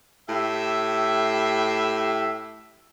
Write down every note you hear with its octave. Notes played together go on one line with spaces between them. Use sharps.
A2 G4 E5